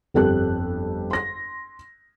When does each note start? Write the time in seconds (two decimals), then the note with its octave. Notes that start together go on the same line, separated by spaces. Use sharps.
0.14 G1 F2 G4 A4 F#6
1.11 C6 A#6